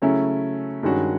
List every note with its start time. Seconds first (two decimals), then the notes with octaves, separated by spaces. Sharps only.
0.02 C#3 F#3 A3 C#4 E4
0.83 G2 D#3 G#3 C#4 F#4